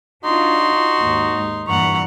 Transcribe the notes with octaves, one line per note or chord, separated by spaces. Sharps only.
D4 D#4 F4 F#4 C6
D#2 G#2
G2 A#2 E3 F#5 A#5 C#6